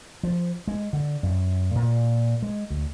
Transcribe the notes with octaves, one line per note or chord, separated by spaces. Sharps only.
F3
G#3
D3
F#2
A#2
G#3
D2